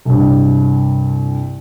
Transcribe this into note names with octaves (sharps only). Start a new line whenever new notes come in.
C2 G2